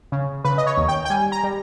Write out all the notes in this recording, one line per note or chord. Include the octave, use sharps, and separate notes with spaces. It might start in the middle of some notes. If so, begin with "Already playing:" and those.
C#3
C#3 B4
D#5
C#5
D#2
G5
G5
G3 G#5
A#5
G3